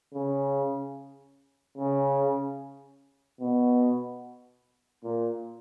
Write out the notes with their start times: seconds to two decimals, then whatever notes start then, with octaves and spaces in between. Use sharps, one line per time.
0.14 C#3
1.78 C#3
3.40 B2
5.04 A#2